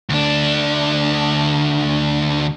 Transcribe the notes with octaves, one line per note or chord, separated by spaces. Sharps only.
D2 D4